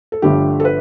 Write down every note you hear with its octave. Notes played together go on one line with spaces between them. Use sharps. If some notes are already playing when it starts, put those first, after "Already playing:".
A4
G1 G2 D3 F3 A3 G4
A4
B4